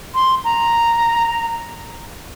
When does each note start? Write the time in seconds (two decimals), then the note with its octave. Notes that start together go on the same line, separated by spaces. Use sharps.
0.15 C6
0.45 A#5